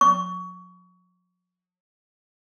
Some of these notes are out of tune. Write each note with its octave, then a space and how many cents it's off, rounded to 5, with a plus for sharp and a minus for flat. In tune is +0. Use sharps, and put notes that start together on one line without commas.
C#6 +25